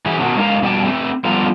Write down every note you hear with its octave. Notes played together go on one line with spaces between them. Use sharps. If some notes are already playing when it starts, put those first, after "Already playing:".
E3 F#3 G#4 E5
B2 D#3 F#3
G#3 A3 D#4 A#4 F5 A#5
F2 B2 G3 D4 G5 A5
A3 C4
F3 G3 B3 F4 A4 A#5